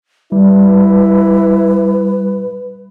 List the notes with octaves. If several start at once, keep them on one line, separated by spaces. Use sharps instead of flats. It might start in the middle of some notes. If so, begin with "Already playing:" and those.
G3 E4 B4